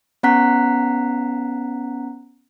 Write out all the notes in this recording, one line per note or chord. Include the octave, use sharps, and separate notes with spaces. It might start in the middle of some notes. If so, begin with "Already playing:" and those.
B3 C#4 F#5 A#5 F#6 B6